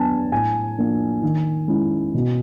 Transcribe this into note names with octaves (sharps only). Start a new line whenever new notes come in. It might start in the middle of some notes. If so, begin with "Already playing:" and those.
Already playing: F#3 B3 D4 G#5 A5
A2 G#5
F3 A#3 D4
D#3
G#3 C#4 E4
B2